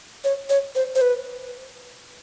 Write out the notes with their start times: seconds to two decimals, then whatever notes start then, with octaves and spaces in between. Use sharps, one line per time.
0.24 C#5
0.50 C#5
0.75 C5
0.95 C5
1.01 B4